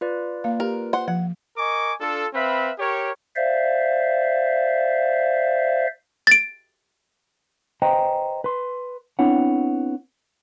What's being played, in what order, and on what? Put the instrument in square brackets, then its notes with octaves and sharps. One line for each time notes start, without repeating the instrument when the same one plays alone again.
[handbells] F4 B4 D5
[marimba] A#3 F5
[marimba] G4 [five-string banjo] A#4
[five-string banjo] C5 F#5
[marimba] F3 [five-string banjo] F#5
[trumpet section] A#4 D#5 G#5 C#6 D6
D4 F4 A4
C4 B4 E5 F5 B5
G4 A#4 C#5
[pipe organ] C5 D5 E5 F5
[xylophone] A6 D7
[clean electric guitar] B4 C5 D#5 G5 G#5 A#5
B4 C6
B3 C4 D4 E4 C#5 F#5